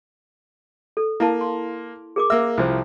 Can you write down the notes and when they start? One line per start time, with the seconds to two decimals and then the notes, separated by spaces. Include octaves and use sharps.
0.97 A4
1.20 A#3 E4 F5 A5
1.41 C6
2.16 G#4 A#4 D6
2.30 A#3 E5 E6
2.57 C2 F3 E4 C5